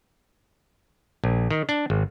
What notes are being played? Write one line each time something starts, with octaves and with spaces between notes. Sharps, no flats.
A#1
D#3
D4
G#1